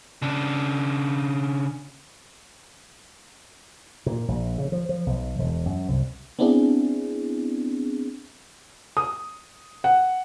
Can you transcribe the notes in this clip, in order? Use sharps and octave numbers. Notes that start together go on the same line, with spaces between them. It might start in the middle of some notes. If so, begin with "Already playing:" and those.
C#3 D4
A#2
A#1
C#3
F3
F3
B1
E1
F#2
C2
B3 C4 D4 E4 G#4
D#6
F#5